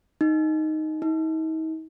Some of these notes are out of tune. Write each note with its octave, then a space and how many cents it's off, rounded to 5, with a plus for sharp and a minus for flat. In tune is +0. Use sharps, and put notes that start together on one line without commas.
D#4 +0
D#4 +40